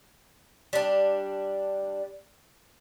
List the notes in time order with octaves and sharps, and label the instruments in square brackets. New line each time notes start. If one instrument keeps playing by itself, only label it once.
[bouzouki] G3 D4